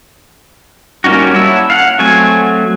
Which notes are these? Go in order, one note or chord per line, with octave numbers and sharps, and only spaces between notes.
G3 A#3 C#4 D#4 F#4
E4 C#5 F#5 A5 E6
F5 F#5
F#3 A3 C4 G#5